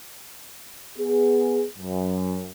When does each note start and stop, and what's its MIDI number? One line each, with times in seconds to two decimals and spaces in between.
0.98 1.65 59
0.98 1.65 68
1.78 2.50 42